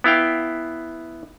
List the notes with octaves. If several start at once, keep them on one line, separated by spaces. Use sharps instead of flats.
B3 E4 F5 G5